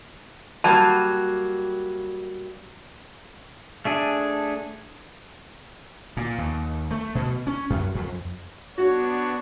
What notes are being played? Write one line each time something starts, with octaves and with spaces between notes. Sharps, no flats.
F#3 G3 A#3 A5
A3 D4 G#4
A#2
D#2
A3
B2
C#4
F#2
F2
B3 D4 F#4 C#5